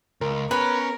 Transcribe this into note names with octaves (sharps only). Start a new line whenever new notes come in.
C#2 A#4
B3 C#4 A#4 B4